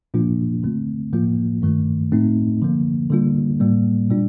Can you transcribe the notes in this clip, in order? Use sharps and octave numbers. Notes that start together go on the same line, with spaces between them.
A#2 F3 A#3 D4 F4
D3 A3 C4
A2 F3 A#3 F4
G2 D#3 A3
A2 A3 C4 D#4
D3 F3 A#3
D3 G3 A#3 F4
A2 G3 A#3
A#2 G3 D4 F4